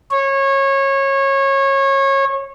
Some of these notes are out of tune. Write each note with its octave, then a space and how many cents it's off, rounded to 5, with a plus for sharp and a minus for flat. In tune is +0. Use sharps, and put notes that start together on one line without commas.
C#5 -25